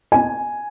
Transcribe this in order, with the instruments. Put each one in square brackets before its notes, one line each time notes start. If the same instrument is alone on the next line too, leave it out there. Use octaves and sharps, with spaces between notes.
[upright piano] G#5